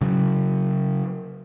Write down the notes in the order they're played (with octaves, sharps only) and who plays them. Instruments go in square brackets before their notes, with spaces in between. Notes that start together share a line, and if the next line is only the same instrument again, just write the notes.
[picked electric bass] C#3 F#3